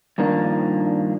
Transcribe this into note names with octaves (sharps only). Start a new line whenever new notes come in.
G2 D#3 F3 A#3 D4